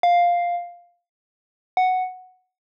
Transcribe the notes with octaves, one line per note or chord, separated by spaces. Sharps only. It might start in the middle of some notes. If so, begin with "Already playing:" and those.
F5
F#5